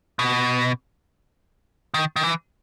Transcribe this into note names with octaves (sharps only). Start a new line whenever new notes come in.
B2
D#3
D#3
E3